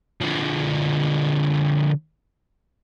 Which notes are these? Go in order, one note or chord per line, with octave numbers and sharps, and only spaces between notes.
D3 F3